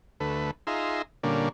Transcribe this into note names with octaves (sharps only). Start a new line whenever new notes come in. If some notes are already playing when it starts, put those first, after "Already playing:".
D2 A3 B4
D#4 F4 G#4 E5 A#5 C6
A#2 D3 G3 A#3 C#4 D4